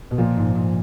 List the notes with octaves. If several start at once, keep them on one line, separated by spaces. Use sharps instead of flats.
B2
A#2 F3
G#2
G#2